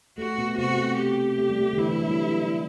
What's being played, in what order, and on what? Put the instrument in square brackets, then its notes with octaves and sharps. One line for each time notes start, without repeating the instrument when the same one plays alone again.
[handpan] A3 [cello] F#4
[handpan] B2 B3
[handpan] C3 C4 [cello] F#4
[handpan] A3
[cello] G4
[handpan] A3
G3
A3
D3
[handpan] E3 [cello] E4
[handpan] E3
F#3
G3